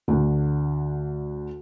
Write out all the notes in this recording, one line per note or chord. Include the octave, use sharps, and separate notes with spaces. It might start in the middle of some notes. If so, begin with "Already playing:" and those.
D2 D3